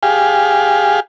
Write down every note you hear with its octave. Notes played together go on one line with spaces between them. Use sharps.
G4 G#4 F5